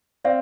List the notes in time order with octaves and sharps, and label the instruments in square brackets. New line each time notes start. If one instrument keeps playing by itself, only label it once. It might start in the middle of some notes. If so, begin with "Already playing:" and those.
[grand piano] C4 [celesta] D5 F5